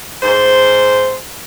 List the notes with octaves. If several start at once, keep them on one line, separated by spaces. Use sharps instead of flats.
G#2 C5